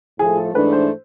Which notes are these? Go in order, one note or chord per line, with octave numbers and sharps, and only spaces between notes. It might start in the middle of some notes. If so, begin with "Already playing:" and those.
A2 F3 A3 G#4
A4
G#2 E3 A3 D4 B4
C5